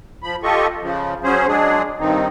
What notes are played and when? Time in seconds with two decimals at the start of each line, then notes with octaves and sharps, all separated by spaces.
0.23 F3 B5
0.43 F4 G4 A4 D#5 C#6
0.82 C#3 F3
1.24 F#3 C#4 G#4 C5
1.47 F#3 G#3 D4 G#4
2.00 G2 D#3 C4 D#4